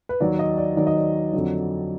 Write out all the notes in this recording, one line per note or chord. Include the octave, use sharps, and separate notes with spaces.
B4
D#2 D#3 F#3 D5
D#5
D5
D#2 D#3 F#3 D5
D#5
D5
F2 D3 F#3